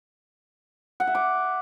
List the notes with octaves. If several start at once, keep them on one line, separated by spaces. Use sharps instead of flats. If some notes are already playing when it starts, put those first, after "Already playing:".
F#5
E5
D6